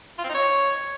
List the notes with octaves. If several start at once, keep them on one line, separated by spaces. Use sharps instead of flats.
F4
C4
D#4
C#5